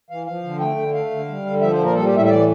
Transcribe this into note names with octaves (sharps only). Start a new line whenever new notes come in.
E3 F5
F3 F5
D3
A3 G5
D3
A3 F5
D3
G3
D3
F3 E5
C5
A#2
A#4
G3 A4
G4
A2 E5
E5
E3 D5